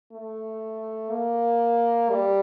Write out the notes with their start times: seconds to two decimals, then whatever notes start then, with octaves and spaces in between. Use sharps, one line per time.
0.12 A3
1.11 A#3
2.10 G3